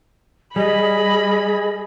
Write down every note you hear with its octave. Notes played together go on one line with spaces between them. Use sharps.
G3 G#4 D#5 B5